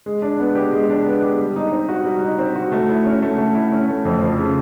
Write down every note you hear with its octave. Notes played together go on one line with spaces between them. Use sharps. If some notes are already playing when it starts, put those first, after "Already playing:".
G#3
D4
B3
G4
G#3
D4
B3
G4
G3
D#4
C4
F#4
G3
D#4
C4
F#4
A3
E4
C#4
A3
A3
E4
C#4
A3
F2
F3
C#3